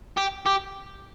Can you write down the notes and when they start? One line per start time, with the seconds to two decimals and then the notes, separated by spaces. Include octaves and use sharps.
0.17 G4
0.46 G4